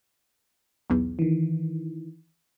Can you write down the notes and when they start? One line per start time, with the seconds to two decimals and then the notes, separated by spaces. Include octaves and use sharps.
0.90 B1 E2
1.19 D#3 E3